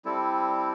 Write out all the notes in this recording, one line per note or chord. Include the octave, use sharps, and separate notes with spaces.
G3 C4 E4 A4